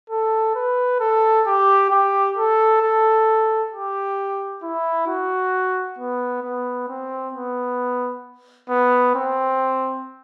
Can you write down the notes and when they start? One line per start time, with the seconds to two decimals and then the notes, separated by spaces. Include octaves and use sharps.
0.10 A4
0.55 B4
1.00 A4
1.46 G4
1.90 G4
2.37 A4
2.82 A4
3.72 G4
4.63 E4
5.07 F#4
5.98 B3
6.43 B3
6.88 C4
7.34 B3
8.69 B3
9.15 C4